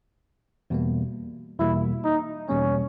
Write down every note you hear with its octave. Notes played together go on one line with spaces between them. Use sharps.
E2 B2 G3 A#3
E2 B2 G3 A#3 E4
D#4
E2 B2 G3 A#3 C#4